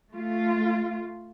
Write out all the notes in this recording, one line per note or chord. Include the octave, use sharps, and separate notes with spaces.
A3 F4